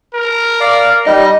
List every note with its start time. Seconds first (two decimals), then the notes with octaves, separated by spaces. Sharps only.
0.14 A#4
0.61 D5 F5
1.07 G3 D#4 D#5